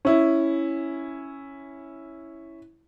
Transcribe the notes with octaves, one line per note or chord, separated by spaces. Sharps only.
C#4 E4